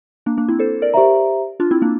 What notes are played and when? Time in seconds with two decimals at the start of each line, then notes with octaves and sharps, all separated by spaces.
0.26 A#3 D4
0.38 A#3 D4
0.49 C4 E4
0.59 A4 C5
0.82 A#4 D5
0.94 G4 C5 E5 A#5
1.60 D4 F4
1.71 C4 E4
1.82 A#3 D4